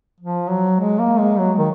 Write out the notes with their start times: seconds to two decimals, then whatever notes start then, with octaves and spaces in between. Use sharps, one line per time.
0.20 F3
0.50 F#3
0.80 G#3
0.99 A#3
1.19 G#3
1.38 F#3
1.58 D#3